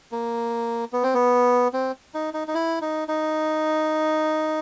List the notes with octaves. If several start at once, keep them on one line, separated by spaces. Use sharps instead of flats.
A#3
B3
C4
B3
C4
D#4
D#4
D#4
E4
D#4
D#4